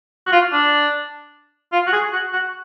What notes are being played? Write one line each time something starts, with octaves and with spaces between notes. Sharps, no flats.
F#4
F4
D4
F4
F#4
G#4
F#4
F#4